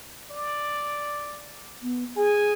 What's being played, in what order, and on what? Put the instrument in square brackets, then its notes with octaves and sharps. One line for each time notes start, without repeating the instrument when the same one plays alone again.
[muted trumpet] D5
[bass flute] B3
[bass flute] G#4 [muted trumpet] G#5